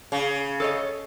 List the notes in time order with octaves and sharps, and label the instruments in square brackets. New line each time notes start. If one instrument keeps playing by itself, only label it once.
[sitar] C#3
[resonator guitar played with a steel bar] A4 C#5 D#5